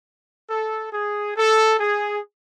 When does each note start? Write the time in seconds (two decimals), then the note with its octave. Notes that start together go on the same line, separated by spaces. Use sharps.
0.48 A4
0.92 G#4
1.36 A4
1.80 G#4